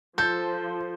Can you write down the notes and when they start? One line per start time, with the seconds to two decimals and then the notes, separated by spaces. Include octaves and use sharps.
0.18 F3 A4 C5 G6